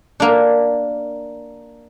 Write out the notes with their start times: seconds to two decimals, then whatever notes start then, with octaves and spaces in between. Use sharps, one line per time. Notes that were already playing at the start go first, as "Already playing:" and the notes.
0.20 A#3 D4